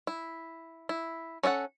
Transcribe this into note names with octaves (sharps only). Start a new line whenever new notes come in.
E4
E4
C#4 D4 A4 F#5